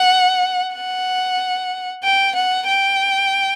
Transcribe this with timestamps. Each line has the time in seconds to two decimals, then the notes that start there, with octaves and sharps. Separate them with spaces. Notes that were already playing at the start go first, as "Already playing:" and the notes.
Already playing: F#5
0.74 F#5
2.03 G5
2.35 F#5
2.67 G5